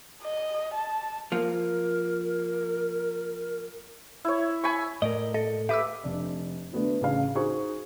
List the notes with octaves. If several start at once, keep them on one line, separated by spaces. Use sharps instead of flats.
D#5
A5
F3 A#3 F4 A#4
E4 C#5
G#5 B5 C#6
A2 A#4 D5 D#5
A4 D#5
G4 B4 E5 D6 E6
F1 D4
D3 A3 B3 F#4
A1 C#3 F5
D#4 F#4 G#4 C5 C#6